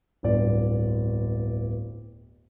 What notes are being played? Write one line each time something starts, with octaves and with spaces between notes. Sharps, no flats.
D1 G1 D5